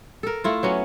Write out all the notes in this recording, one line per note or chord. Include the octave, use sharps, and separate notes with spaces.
A4 A#4
A3 E4 F4
F#3 B3 C#4